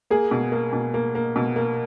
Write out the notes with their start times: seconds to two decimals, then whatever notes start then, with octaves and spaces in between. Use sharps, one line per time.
0.10 A#3 G#4
0.31 B2
0.52 A#3
0.73 B2
0.94 A#3
1.15 A#3
1.36 B2
1.56 A#3